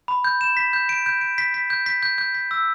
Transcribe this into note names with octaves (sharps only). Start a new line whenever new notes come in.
B5
G6
E7
B6
G6
D7
G6
D7
B6
B6
G6
B6
G6
G6
B6
E6